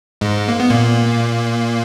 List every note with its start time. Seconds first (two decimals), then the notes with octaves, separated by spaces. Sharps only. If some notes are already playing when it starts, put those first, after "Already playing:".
0.21 G#2 G#3
0.48 A#3
0.60 B3
0.70 A#2 A#3